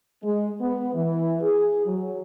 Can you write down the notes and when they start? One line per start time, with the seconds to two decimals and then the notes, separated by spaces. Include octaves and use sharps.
0.23 G#3
0.61 B3
0.94 E3
1.41 G#4
1.86 F#3